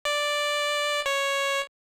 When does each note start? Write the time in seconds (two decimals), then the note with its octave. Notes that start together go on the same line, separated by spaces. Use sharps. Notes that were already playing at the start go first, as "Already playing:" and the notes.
0.05 D5
1.06 C#5